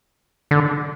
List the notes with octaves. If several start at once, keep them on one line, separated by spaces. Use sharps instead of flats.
D3